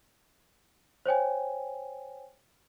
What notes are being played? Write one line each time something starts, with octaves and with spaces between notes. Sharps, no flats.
C5 C#5 G5 G#5